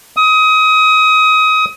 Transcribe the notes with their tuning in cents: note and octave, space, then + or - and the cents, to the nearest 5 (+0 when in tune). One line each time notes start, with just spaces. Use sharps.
D#6 +25